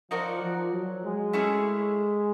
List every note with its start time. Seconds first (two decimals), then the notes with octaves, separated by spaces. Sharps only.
0.11 F3 D#4 F#4 A#4 D5
0.41 F3
0.71 F#3
1.03 G#3
1.33 A3 C#4 E4 G#4